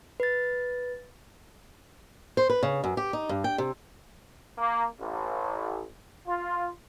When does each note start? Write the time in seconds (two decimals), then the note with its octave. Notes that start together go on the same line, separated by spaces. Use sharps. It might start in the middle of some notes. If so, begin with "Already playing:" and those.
0.20 B4 A6
2.37 C5
2.50 B4
2.63 C#3
2.84 F#2
2.97 G4
3.13 D#4
3.29 G2
3.44 G5
3.58 C3
4.58 A#3
4.99 A1
6.27 F4